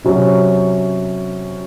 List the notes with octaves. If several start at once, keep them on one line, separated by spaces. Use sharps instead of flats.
C3 F#3 C#4 F#4